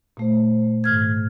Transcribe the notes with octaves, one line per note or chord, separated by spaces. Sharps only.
A#2 A3 C5
G#2 D#3 F6 G#6